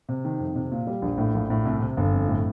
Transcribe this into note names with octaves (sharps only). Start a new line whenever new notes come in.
C3
D#3
F2
C3
A#2
G3
A#1
A2
A#1
A2
C2
C3
G1
F2
A2